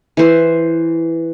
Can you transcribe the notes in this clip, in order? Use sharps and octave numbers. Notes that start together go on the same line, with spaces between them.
E3 C5